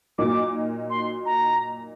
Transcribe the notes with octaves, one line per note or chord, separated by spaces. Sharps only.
A#2 F#3 A#3 D#4 D6
C6
A#5